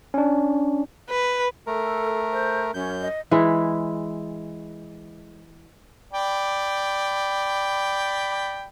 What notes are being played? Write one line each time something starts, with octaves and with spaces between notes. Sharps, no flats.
C#4 D4
B4
A3 A4 A#4
C5
F#2 C#4 G6
D#5
E3 G#3 E4
D5 G5 B5